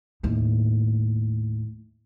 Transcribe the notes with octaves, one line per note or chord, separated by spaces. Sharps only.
D#2 A2